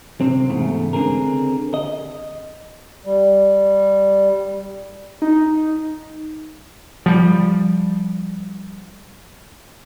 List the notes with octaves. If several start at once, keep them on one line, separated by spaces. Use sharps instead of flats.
C3 C4
E2 G#2 C#3 A3
D3 C4 G#4 A#4
D#5
G3
D#4
F3 G3